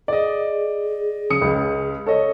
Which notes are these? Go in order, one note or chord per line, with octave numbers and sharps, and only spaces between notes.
G#4 D5 D#5
C#3 D#6 C#7
C#2 C#3
A4 C#5 D#5